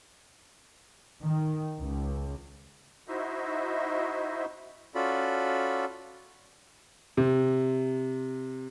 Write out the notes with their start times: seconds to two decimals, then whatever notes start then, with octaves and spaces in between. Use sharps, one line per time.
1.23 D#3
1.80 C#2
3.08 D#4 E4 F#4 C5 D#5 E5
4.95 C#4 F4 F#4 A4 D5 B5
7.17 C3